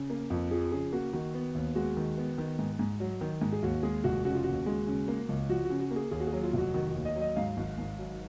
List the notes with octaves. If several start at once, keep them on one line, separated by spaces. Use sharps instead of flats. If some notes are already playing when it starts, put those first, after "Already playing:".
Already playing: C#3
A#3
F2
F3 G#4
C#3 G#4
A#3 F#4
D#3 F#4
B3
D#2
G#3 F#4
D#3
B3
D#3
G#2
G#2
F#3
D#3
G#2
G#4
D#2 F#4
G#3 G#4
F1 F#4
C#3 F#4
F4
D#2 F#4
G#3
C#3
A#3
C#2
F3 F#4
F#4
C#3
F#4
A#3
G#4
D#2 G#4
F#4
G#4
F#3
F4
F1 F#4
D#3 F#4
F#4
D#2
D#5
F#3
D#5
G#2 F5
G#1
G#1
F#3